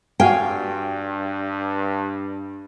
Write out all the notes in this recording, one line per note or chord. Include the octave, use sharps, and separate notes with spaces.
G2 F#4 F5 G5 G#5